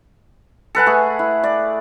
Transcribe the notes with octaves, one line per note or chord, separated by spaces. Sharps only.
A4 B4 F#5 G#5
A3 G#4
E4
D5